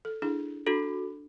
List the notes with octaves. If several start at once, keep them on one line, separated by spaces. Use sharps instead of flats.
A4
D4 E4 G#4
D4 F#4 A4